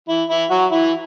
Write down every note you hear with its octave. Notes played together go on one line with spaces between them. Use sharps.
E3 E4
E3 E4
F#3 F#4
E3 E4